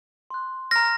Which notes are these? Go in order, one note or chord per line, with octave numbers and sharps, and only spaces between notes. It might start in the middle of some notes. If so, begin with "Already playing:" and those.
C6 F#6
A#5 F6 A#6